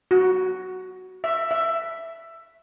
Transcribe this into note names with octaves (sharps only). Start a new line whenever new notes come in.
F#4
E5
E5